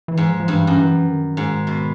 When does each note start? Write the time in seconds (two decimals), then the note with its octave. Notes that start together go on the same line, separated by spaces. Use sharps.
0.08 E3
0.17 G#2
0.28 F3
0.40 F3
0.48 G2 E3
0.67 F#2
0.78 E3
1.07 D#3
1.37 G#2
1.67 B2